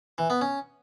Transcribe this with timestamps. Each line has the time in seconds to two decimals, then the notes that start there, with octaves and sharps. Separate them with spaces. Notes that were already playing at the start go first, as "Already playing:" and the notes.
0.18 E3
0.30 B3
0.41 C#4